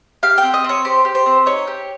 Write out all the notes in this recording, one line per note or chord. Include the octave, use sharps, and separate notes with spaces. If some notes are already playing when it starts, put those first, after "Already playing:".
G4 F5
C4 G5
D#5
C4 C#5
G4 C5
G4
C5
C4
D#4 C#5
G4